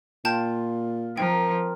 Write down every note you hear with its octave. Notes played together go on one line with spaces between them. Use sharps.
A#2 F4 G5 A5 G6
F3 C4 A#4 G5